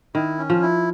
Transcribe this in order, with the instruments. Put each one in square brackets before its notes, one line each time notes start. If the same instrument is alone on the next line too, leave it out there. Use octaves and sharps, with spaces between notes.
[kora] D#3 [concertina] E4
[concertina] C#4
[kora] F3
[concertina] E4